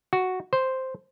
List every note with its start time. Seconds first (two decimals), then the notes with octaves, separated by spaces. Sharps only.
0.13 F#4
0.53 C5